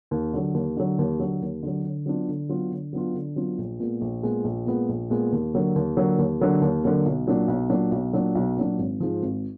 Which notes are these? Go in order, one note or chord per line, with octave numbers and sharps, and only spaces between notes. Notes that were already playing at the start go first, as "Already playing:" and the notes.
D#2
D3 F#3
D#2
D3 F#3
D#2
D3 F#3
D#2
D3 F#3
D3
F#3 B3 D4 F4
D3
F#3 B3 D4 F4
D3
F#3 B3 D4 F4
D3
F#3 B3 D4 F4
A#1
A#2 G#3 B3
A#1
A#2 G#3 B3
A#1
A#2 G#3 B3
A#1
A#2 G#3 B3
D#2
D3 F#3 A#3
D#2
D3 F#3 A#3
D#2
D3 F#3 A#3
D#2
D3 F#3 A#3
B1
A#2 F#3 D4
B1
A#2 F#3 D4
B1
A#2 F#3 D4
B1
A#2 F#3 D4
G#1
G#2 F3
G#1